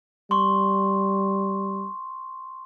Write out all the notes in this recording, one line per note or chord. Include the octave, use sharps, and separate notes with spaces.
G3 C6 C#6